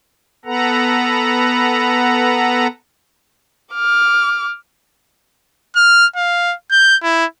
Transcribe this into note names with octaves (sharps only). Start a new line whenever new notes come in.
B3 A4 B4 F#5 A#5
D6 F6
F6
F5
G6
E4